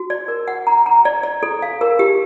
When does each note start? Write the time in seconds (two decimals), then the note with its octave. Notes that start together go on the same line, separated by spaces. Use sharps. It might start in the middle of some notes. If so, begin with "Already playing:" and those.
Already playing: F#4
0.10 D5
0.28 A#4
0.48 F#5
0.67 A#5
0.86 A#5
1.05 D5
1.23 D5
1.43 A4
1.62 F5
1.81 A#4
1.99 G4